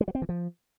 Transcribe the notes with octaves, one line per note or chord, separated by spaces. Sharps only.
G#3
F#3
C4
E3
F3